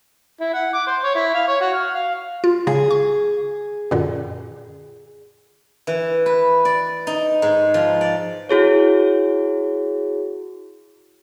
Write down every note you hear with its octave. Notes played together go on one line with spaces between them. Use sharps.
E4
F#5
D6
C5
C#5
E4
F5
C#5
F#4
F6
F5
F4
C#3 G#4
C#6
F#2 A#2 D3
E3
B4
D5
D#4
G#2
F3
D5
E4 F#4 G#4 C#5